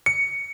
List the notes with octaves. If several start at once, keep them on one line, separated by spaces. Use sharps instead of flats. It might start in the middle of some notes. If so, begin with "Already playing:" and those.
C#7